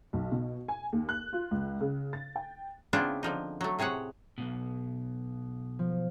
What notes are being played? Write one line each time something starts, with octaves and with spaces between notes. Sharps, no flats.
B1
B2
G#5
D#2
F#6
F4
C#2
C#3
A6
G5
C#3 B3 C4 D4 E4 F4
D3 F3 D#4
F#3 A3
A2 C3 G#4 C#5 F#5
B1 G2 B2
F3